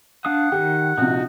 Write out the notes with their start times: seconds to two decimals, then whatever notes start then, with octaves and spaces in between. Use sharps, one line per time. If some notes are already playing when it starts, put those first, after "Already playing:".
0.25 D4 F5 F#5 D#6
0.52 D#3 G4
0.98 A#1 C3 D#4 F#4